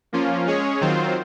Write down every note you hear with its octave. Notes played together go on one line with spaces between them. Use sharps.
F3 A#3 C#4 F4
G#3 C#4 G#4 C#5
D#3 F#3 C4 F4 C5